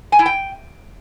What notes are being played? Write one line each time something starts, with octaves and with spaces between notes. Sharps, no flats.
G#5
E4
G5